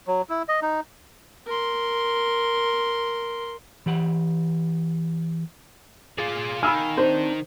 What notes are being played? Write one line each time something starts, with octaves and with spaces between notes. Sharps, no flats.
F#3
E4
D#5
D#4
A#4 C6
E3 G4 F#5
F4 G#4 D5
D#3 F5 G#5 B5 E6 F6
C4 D4 D#4 C5